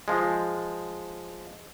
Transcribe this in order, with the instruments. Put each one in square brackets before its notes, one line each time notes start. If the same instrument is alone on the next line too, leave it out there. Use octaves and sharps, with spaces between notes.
[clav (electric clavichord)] F3 G#3